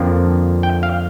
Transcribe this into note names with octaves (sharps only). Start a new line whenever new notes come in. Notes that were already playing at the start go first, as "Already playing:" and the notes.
Already playing: F2 D3 F3 A#3 D4
G5
F5